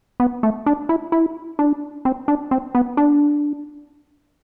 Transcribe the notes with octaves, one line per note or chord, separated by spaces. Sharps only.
B3
A3
D4
E4
E4
D4
C4
D4
C4
B3
D4